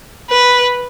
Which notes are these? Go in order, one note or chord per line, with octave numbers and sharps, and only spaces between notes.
B4